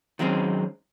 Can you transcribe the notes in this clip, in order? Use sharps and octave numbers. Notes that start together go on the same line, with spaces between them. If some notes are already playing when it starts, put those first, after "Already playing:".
D#3 F#3 G#3 C4 C#4